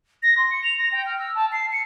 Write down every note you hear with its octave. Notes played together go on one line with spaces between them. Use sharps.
A#6
C6
C#7
F7
A#6
G5
F6
E6
A5
C7
C#7